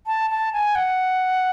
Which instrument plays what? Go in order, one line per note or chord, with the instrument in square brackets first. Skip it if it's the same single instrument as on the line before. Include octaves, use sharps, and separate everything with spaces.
[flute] A5
A5
G#5
F#5